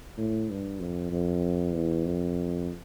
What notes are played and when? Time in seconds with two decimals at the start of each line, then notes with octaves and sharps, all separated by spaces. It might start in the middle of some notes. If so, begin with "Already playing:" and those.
0.18 A2
0.50 G2
0.81 F2
1.12 F2
1.74 E2
2.05 F2